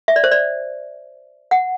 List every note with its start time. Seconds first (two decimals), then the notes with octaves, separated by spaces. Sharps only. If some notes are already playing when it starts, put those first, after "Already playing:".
0.08 E5
0.16 D5
0.24 C5
0.31 D5
1.51 F#5